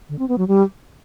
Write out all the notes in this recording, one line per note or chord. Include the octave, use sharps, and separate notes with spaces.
D3
C4
B3
F#3
G3